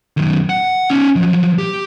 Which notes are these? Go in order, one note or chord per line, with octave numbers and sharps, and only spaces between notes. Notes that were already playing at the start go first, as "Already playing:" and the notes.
F#2 D#3
F#5
C#4 D#4
F3 F#3
G4